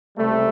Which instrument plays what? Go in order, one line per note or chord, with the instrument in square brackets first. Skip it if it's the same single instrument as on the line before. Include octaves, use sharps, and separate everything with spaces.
[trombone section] C#2 C3 G3 A3